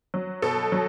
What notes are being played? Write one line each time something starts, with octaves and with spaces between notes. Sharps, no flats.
F#3
B2 A4
F#3